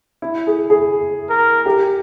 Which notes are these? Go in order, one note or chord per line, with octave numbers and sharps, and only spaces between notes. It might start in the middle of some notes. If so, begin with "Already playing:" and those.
E4
G#4
G#4
A#4
G4